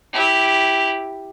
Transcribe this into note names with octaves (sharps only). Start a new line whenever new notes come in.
E4 G4